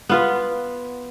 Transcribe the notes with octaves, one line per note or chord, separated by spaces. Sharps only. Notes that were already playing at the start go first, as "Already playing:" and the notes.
B3 F4 B4